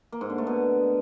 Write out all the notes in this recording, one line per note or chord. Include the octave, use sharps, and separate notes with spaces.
A#3
G#2
D3
A3
B2